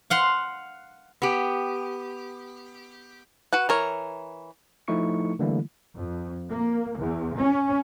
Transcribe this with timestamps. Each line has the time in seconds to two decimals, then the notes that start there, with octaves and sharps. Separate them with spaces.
0.10 F5 F#5 C6
1.22 B3 G4
3.53 F#4 B4 F#5
3.69 E3 A#4 C#5
4.88 F3 A3 D#4 E4 C#6 C#7
5.39 D3 E3 G3 A3 A#3 E4
5.95 F2
6.49 A#3
6.98 E2
7.37 C#4